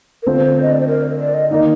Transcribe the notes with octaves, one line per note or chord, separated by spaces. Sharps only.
A#4
D3 A3 C4 F4 C5
D#5
D5
C5
A#4
D5
D#5
D#3 A#3 D#4 D#5